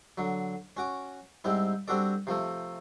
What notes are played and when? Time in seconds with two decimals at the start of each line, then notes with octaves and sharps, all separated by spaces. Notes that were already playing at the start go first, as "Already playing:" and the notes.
0.18 D3 F#3
0.77 C#4 F#4 D6
1.44 G#2 G3 C4 E4
1.88 G3 C4 D4 F#4 A4 D5
2.27 C3 F3 A3 A4